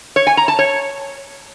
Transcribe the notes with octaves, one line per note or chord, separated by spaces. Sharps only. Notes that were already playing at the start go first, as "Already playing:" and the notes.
C#5
G#5
A#5
A5
C#5